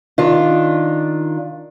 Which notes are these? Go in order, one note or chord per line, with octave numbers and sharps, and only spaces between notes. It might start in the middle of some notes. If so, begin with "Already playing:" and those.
D#3 D4 F4